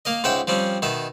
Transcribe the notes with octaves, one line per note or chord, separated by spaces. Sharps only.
A#3 A#4 D#5
C#2 G#2 E5 F#5 G5
F3 G3 C4 C#4
B2 D#3 E5